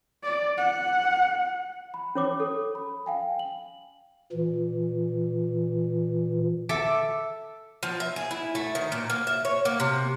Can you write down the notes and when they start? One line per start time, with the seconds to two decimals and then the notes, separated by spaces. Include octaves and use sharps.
0.23 D5
0.58 F#5
1.94 B5
2.15 C#4 C#5 D6
2.40 A4
2.75 B5
3.06 F5 G5 G#5
3.39 F#7
4.32 A#2 E3
6.69 A4 E5 D6
7.83 F3
8.00 E5
8.16 G#4
8.31 E4
8.55 A3
8.75 D#3
8.92 A#2
9.10 A#3
9.27 E5
9.45 C#5
9.65 A#3
9.80 C3